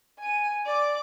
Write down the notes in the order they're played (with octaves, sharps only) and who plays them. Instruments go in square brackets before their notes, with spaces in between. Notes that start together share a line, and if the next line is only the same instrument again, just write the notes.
[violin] G#5 D#7
D5 D6